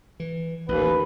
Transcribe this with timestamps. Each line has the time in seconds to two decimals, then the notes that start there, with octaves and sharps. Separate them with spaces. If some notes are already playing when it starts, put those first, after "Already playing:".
0.20 E3
0.69 A1 D#2 B4